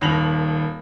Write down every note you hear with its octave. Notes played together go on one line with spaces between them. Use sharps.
D#1 D#2 B5 A#6 F7 F#7